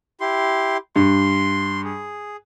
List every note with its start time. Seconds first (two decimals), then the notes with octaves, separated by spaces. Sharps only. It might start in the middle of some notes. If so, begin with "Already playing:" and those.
0.21 E4 G4 C6
0.96 G2 C6
1.84 G#4